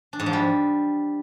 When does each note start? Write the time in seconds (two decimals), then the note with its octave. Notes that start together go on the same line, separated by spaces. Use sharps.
0.13 D4
0.20 G#2
0.26 F3
0.33 G3